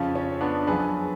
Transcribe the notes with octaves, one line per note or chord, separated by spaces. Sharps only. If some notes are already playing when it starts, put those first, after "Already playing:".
Already playing: F2 C#3 F3 C#4 F4
C#4
B3 D4
F#2 F3 G#4 B4